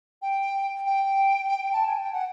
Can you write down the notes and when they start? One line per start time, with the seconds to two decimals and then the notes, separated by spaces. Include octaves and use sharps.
0.22 G5
0.86 G5
1.73 A5
1.87 G#5
2.00 G5
2.13 F#5